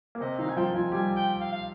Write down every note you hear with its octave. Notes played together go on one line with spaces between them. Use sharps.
A#3
C3 C4 D#5
D#3 D#4 F5
G#5
F3 F4 G5
F3 F4 G#5
G3 G4 G#5
G5
F5
F5